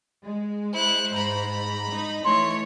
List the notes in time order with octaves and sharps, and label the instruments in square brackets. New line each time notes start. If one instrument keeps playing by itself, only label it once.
[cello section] G#3
[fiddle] E4 F#6 [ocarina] C5
[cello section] G#2 [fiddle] A#5 B5
[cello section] D#4
[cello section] E3 A3 [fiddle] C#5 [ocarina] C6